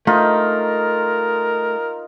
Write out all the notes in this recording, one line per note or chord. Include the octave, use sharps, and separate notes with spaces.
A3 D#4 F4 A#4